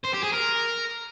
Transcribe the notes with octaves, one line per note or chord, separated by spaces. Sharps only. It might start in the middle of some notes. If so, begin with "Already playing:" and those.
C5
G4
G#4
A#4